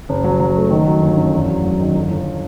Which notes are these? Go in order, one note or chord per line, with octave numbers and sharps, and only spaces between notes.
F#1
F#3
F#3
A3
D#3
F#3
G1
F#2
E2
F#3
F#3
D#3
G1
G1